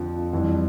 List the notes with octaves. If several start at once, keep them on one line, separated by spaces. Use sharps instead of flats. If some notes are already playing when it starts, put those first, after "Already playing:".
Already playing: F2 D3 F3
F2 E3 G3